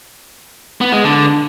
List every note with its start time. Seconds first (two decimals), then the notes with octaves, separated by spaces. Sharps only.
0.81 B3
0.92 G#3
1.04 D3